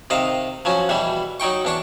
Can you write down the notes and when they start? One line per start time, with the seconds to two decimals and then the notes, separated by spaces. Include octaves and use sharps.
0.10 C3 D#3 D#5 F5
0.65 F3 F#3 C#4
0.89 E2 B2 E3 G3
1.40 F#3 D#4 G5 C#6
1.65 E2 D4 C#6